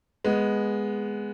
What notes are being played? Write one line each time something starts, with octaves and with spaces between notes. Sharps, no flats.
G#3 B3